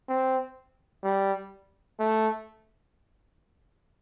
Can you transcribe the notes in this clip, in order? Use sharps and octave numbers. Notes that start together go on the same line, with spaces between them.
C4
G3
A3